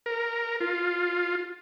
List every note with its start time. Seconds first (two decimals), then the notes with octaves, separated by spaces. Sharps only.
0.06 A#4
0.61 F4